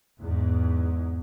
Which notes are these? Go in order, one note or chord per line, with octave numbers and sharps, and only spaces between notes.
E2 G#2